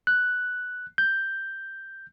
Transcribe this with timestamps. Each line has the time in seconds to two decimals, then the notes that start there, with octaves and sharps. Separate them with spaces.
0.07 F#6
0.98 G6